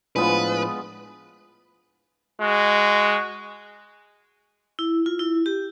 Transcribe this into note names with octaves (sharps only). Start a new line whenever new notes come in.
A2 F3 G#3 B3 D4 F4 B4
G#3 F#4
E4
F4
E4
G4